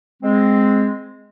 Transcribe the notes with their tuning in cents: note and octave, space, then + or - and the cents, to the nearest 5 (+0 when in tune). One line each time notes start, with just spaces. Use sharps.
G#3 +0 C4 +0